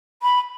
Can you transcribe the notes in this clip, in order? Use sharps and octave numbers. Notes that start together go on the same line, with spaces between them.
B5